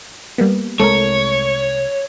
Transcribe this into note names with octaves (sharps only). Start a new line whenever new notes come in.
G3 A#3 B3
C2 G#3 A3 A4 A#4 C#5